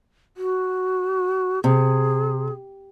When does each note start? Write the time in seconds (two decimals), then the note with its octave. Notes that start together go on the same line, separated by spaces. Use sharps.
0.37 F#4
1.64 C3 G#4